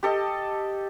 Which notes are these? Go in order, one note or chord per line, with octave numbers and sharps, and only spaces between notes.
G4 A4 D#5